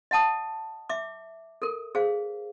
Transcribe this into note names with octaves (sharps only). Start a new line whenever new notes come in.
D#5 F#5 A5 D#6
E5 D6
A4 A#4
G#4 C5 F5